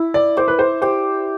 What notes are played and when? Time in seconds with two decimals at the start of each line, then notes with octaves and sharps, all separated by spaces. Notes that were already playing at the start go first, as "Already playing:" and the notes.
Already playing: E4
0.14 D5
0.37 C5 D5
0.48 B4
0.59 C5
0.82 G4 C5